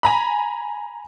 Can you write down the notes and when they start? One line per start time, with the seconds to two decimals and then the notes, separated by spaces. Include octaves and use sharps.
0.03 G#5 A#5 B5